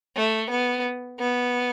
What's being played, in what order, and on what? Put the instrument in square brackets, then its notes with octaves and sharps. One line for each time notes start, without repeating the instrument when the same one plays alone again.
[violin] A3
B3
B3